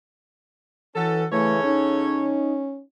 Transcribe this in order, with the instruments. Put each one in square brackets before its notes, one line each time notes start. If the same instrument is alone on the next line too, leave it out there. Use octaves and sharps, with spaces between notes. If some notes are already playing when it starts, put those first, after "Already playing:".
[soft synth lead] E3 [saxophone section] C#4 F#4 A4
[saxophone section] C#3 A4 C#5 [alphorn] E3 [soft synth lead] A3
[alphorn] C#4 [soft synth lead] D#4